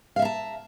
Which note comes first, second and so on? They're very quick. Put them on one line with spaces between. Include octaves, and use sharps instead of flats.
F5 E5 A#5 A5